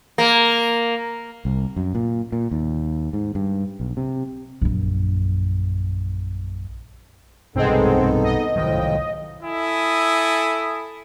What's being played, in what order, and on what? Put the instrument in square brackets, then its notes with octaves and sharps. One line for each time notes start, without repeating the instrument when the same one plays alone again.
[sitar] A#3
[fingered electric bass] C2
F#2
A#2
A#2
D#2
G#2
G2
B1
C3
[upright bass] A#1 F#2
[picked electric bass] B1 G2 C3 [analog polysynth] G#3 C4 [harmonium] B3 D#4 A4
[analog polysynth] D#5
[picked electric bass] C2 D#3 F#3 [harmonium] A2 F3 G5
[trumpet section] E4 A4 G#5 D#6